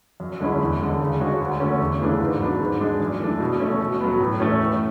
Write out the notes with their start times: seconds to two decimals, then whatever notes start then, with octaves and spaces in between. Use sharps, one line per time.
0.20 F#2
0.40 D3 G#3 C#4 E4
0.61 E2
0.80 D3 G#3
1.01 C#3
1.21 G#3 D4 F#4 C#5
1.40 D2
1.60 D3 A3 C#4
1.80 E2
2.00 C#3 E3 A3 D4
2.21 G#2
2.40 F#3 B3 D4
2.60 G#2
2.80 G#3 D4
3.00 F#2
3.20 E3 A3 D4
3.40 B2
3.60 A3 C#4
3.80 B2
4.01 F#3 B3
4.20 A2
4.40 E3 A3 C#4
4.60 A2